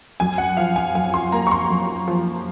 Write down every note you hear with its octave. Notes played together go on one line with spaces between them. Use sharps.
F#2 G#5
F#5
F3 F5
G#5
F#2 G#5
C6
A#3 A#5
C#6
C6
F#2
F3